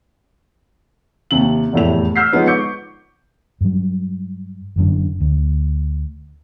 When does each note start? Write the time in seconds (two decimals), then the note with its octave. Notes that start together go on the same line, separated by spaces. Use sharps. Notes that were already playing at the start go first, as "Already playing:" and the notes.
1.31 D#2 C3 F#7
1.73 F1 E2 A2 A3 F7
2.16 E6 F6 G6 B6 C7
2.32 F3 G#3 B3 D#4 C#5
2.47 C#6 D6 G6 C#7
3.61 G2 F#3
4.76 F#1 F#2 D3
5.20 D2